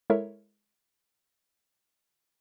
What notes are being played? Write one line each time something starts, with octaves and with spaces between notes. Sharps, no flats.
G#3 E4 A4 A#4 C#5 E5